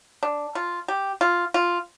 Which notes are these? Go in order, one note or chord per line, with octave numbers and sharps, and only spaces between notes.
D4
F4
G4
F4
F4